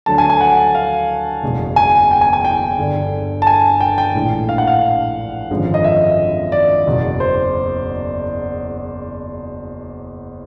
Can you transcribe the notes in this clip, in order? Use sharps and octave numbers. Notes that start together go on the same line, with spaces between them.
D2 D3 F#3 A3 A5
G#5
G#5
F#5
F5
F#1 E2 B2 G#3
G#5
G5
G#5
G#5
G5
G1 G2 D3
A5
G#5
G5
G5
A#1 A2 E3 G#3
F5
F#5
F5
G#1 F#2 D3 F3 G#3
D#5
E5
D5
F#1 E2 B2 F#3
C5